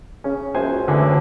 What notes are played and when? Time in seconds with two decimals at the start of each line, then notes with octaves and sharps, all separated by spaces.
0.24 C#3 C#4
0.55 C#2 F#2 C5 G#5
0.88 D2 D3 E3
1.01 F#3